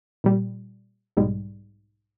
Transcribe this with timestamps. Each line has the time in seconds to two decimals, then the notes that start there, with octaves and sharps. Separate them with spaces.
0.24 A#2 G3
1.17 B1 G#2 G3 G#3